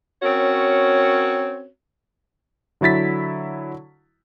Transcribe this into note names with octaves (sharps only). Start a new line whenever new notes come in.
C4 C#4 F#4 A#4 C#5
D3 F#3 E4 A6 B6